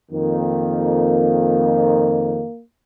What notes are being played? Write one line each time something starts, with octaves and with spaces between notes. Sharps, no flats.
F2 D#3 A#3